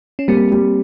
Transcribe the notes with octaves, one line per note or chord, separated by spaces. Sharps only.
C#4
G3 A#3 C4
G3